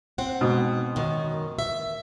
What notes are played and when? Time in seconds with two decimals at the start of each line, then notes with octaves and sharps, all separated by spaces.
0.18 C4 F#5
0.41 G#2 B2
0.96 F#2 D#3
1.59 E5